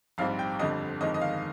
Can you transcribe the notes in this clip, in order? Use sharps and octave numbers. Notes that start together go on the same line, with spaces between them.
A#1 G#2 G3 C4 F5
G5
G1 F2 D3 G3 D#5
G1 F2 D#3 G#3 D#5
D#5
F5